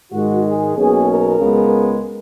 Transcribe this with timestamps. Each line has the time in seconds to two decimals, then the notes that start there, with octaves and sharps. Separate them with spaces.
0.11 G#2 D#3 G#3 F#4
0.44 G#4
0.75 B1 B2 A#3 C#4 G#4
1.07 A#4
1.38 C#2 C#3 G#3 B3